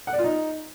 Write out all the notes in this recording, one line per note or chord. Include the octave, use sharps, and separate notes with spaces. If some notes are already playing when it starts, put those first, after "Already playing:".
F#5
D5
F4
D#4